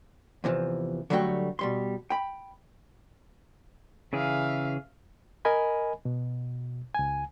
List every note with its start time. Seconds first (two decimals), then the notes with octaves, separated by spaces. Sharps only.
0.44 E2 C3 E3 F3
1.10 D3 F#3 G3 A3 F#4 G5
1.59 B2 G3 C6
2.10 G5 B5
4.13 C#3 E3 G#4 E5 F5
5.45 A#4 D#5 G#5 B5
6.05 B2
6.95 C#2 G#5